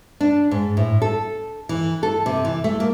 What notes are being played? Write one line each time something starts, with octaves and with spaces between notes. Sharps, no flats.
D4
G#2
A2
A4
E3
A4
C3
E3
A3
A#3